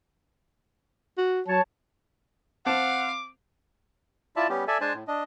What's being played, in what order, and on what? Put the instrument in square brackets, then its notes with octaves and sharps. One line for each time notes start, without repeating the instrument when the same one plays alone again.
[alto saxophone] F#4
[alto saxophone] F#3 [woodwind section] C#5 A5
[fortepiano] C4 A5 [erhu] F5 [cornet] F#5 [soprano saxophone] D6
[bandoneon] E4 F4 D5 E5 A5
G3 B3 C#4 G4
A4 D5 E5 G#5
G#3 D4 C5 G#5 A5
A2
D4 D#5